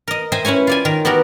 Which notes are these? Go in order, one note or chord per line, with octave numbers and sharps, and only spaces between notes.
A#4 D#5
C5 D#5 E5 G5 G#5
C#4 E4 B4 C#5 G#5
F4 D5 G#5
D#3 A#4
B3 F#4 G4 A#4